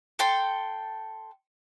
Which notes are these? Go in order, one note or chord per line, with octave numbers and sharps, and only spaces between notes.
A4 G5 C6